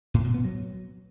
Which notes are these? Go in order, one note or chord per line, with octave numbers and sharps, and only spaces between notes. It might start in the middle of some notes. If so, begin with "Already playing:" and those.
A2
B2
B3
F#3